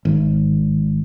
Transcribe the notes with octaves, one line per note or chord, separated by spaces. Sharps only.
G#1